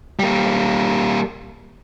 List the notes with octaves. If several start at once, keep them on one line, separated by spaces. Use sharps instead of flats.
G3 A#3